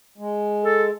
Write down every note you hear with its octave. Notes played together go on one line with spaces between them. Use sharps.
G#3
A4